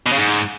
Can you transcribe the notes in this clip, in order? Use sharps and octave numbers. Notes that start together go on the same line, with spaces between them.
B2
C#3
G#2